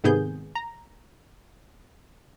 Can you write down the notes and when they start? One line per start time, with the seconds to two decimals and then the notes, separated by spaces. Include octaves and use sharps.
0.04 G#2 C3 D#3 B3 G#4 G6
0.55 A#5